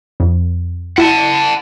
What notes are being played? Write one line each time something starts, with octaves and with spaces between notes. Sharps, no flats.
F2
E4 F#5 A5